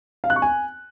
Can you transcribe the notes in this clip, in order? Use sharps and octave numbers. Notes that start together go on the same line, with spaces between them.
F5
F#6
C#6
G#5